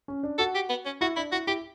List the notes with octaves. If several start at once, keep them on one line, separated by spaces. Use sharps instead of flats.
C#4
D4
F#4 A4
G4
B3
C#4
E4 F#4
D4 E4
E4 F#4
E4 G4